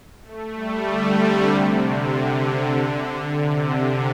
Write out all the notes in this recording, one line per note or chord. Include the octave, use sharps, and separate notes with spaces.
A3
G3
D3
C3
C3
D3
D3
C3